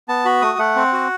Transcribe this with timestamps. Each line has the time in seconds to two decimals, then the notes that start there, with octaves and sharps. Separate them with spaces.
0.08 B3 A5
0.25 F#4 B5
0.42 A3 D#6
0.59 A3 F#5
0.76 C4
0.93 F#4